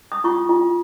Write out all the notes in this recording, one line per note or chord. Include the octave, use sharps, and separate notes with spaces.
D#6
F4 C#6
F4